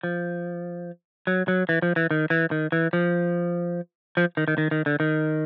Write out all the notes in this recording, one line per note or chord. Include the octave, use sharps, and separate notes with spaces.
F3
F#3
F#3
E3
F3
E3
D#3
E3
D#3
E3
F3
F3
D#3
D#3
D#3
D#3
D3
D#3